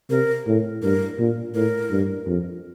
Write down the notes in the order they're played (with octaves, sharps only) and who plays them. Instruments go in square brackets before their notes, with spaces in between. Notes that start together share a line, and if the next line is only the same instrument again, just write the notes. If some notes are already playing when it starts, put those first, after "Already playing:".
[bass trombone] C3 [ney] A#4
[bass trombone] A2
[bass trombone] G2 [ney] A#4
[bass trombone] A#2
[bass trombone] A2 [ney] A#4
[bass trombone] G2
F2